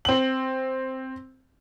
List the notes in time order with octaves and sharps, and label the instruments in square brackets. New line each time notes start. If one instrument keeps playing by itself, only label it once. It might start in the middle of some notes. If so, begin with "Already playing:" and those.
[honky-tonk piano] C4 F#7